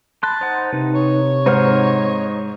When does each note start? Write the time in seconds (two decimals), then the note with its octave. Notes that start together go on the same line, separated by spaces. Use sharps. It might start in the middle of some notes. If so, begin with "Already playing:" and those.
0.23 A5 B5 C6 F#6
0.41 D#4 C5 F#5
0.73 C3 D#4 B4
0.95 C#5
1.46 G#2 D#4 C5 F#5 F6